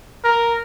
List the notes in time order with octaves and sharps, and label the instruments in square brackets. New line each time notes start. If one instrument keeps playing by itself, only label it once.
[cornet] A#4